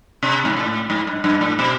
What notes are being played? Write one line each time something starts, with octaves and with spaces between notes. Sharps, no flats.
C3
G#2
A2
G#2
G2
G2
A2
B2